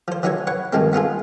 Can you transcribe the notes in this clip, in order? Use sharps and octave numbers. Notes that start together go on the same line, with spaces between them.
F3 C5
E3 F#3 D#4 F#4 C#5
B4 C#5 F#5
G2 D#3 F3 G#3 C4
B3 D#4 F4 G#4